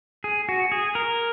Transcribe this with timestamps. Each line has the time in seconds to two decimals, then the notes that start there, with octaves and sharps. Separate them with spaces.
0.24 G#4
0.49 F#4
0.72 G#4
0.95 A#4